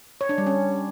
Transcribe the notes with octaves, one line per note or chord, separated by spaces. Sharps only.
C#5
D4
G3
C#4